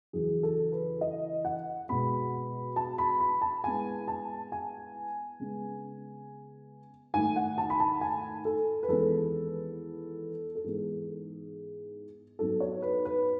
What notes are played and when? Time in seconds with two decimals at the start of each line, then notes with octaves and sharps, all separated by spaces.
0.13 E2 C#3 F#3 G#4
0.43 A4
0.72 B4
1.01 D#5
1.45 F#5
1.89 B2 G#3 B3 B5
2.76 A5
2.98 B5
3.20 B5
3.42 A5
3.64 A2 G#3 B3 G#5
4.08 A5
4.52 G#5
5.40 C#3 G#3 B3
7.14 G#2 D#3 A3 G#5
7.36 F#5
7.58 A5
7.70 B5
7.80 A5
8.01 G#5
8.45 A4
8.83 B4
8.88 E2 D#3 G#3 B3 A4
10.55 A4
10.64 G#2 E3 G#3 B3 G#4
12.39 G#2 F#3 B3 A4
12.60 C#5
12.82 B4
13.05 B4